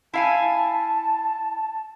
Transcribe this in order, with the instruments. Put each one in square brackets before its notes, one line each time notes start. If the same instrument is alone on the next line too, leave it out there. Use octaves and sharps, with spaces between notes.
[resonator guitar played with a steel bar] E4 F5 G#5 [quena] A5